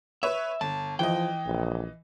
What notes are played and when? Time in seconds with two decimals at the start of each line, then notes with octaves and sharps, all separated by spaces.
0.23 B4 C#5 E5
0.61 G1 A5
0.99 E3 F3 D#5 G5
1.46 A#1